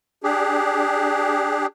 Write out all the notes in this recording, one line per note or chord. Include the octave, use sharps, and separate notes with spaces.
D4 G4 G#4